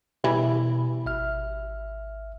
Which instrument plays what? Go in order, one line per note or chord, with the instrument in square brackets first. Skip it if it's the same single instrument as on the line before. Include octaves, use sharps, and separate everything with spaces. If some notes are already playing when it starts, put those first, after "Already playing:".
[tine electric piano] B2 [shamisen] E3 G3 E4
[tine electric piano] G#1 E5 F6